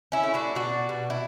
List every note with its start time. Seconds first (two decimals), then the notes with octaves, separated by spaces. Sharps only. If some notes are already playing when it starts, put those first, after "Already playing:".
0.12 C#4 E4
0.23 A3
0.34 D4 F#4
0.55 B2 D4 F#4
0.89 B2
1.10 E4